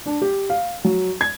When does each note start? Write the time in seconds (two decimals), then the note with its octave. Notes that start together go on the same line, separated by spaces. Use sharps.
0.06 D4
0.22 G4
0.50 F5
0.84 F#3
1.21 G#6